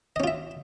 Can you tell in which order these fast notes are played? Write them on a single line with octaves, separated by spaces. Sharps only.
D#5 C#4 F4 E5